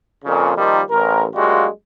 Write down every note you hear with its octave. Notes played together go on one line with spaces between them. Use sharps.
F2 A#2 C#3
D#3 F3 G3 A#3 D#4
A1 A#4
F#2 G3 G#3 A#3 F4 F#4